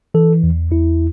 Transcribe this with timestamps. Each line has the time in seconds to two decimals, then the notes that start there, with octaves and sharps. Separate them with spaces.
0.14 E3 A4
0.43 E2
0.72 E2 E4